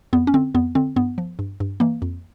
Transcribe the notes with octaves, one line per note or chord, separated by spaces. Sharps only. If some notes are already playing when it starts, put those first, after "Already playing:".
F2 B3
C#4
D3 C4
F2 B3
D3 C4
G2 B3
F3
G2
G2
E3 A#3
F2